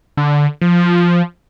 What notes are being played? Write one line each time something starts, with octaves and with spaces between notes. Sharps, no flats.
D3
F3